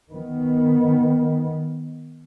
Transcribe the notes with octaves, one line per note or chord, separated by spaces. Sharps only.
D#3 B3